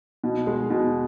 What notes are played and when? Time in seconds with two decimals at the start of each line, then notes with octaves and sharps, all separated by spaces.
0.24 B2
0.47 G#3
0.70 B2